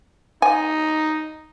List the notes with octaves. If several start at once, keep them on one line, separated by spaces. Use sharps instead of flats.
D#4 G#5